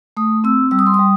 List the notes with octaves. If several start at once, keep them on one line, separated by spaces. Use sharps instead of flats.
A3 D#6
C4 E6
G3 E6
D#6
C6
G3 D#6